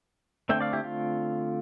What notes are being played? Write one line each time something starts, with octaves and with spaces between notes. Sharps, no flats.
D3 A3 C4 E5 G5
D5 F5
E4 G4
F4